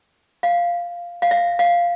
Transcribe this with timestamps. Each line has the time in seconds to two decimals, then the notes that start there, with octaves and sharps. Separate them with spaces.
0.43 F5
1.22 F5
1.31 E5
1.59 F5